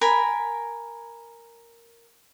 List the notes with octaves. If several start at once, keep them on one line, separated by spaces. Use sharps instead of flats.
A#4 G#5 B5